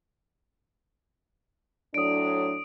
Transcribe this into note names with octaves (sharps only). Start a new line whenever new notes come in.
A2 F#3 D4 D#6 D7